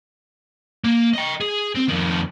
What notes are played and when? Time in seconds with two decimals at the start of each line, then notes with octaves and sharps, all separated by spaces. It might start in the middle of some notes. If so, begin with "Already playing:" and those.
0.84 A#3
1.13 D#5 G5
1.41 G#4
1.75 C4
1.88 F2 D#3